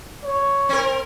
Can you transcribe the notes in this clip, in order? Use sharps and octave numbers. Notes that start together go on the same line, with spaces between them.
C#5
C4 A#4